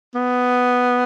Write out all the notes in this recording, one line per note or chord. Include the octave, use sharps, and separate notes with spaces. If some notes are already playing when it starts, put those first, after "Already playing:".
B3